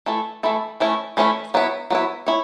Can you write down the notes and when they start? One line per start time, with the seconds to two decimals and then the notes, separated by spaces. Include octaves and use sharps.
0.06 E3 A3 E4 A4
0.43 E3 A3 E4 A4
0.80 E3 A3 C#4 E4
1.17 E3 A3 C#4 E4
1.54 F#3 B3 E4
1.90 F#3 B3 E4
2.27 C#4 E4 C#5